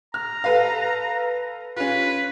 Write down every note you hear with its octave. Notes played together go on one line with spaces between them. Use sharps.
A#5 F6
A4 B4 F5
C#4 F4 B4